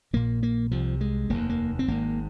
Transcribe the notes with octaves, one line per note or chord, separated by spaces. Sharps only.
A#1 A#2 A#3
A#3
C2 C3 F3
G#3
F1 D#2 A#3
A#3
C4
G#1 G#2 A#3